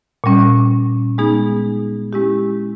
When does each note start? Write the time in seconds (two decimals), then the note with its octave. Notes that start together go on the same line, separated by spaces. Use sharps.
0.24 A#2 G3 C#4
1.18 G#3 B3 D#4 G#4
2.13 G#3 C#4 E4 G4